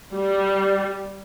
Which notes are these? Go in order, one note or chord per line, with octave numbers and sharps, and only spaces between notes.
G3